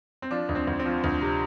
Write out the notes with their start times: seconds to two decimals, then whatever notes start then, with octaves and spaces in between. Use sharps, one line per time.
0.22 C4
0.31 F3 D4
0.49 D2
0.55 C4
0.67 D2
0.79 C4
0.85 F3
1.04 D2
1.21 C3